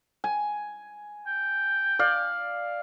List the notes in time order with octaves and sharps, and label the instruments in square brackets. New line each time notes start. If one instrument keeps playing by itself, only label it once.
[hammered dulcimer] G#5
[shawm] G5
[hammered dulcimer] D5 F5